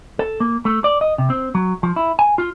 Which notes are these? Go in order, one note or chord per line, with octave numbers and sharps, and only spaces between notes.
A4
A#3
A3
D5
D#5
C3
C4
F#3
F3
E4
G#5
F4